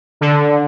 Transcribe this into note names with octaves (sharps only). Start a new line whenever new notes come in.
D3